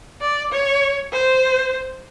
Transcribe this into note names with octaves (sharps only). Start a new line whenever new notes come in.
D5
C#5
C5